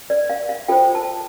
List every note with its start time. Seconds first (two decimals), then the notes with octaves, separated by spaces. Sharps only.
0.10 D5
0.30 F5
0.49 F5
0.68 F4 A4 C5 G5
0.95 A5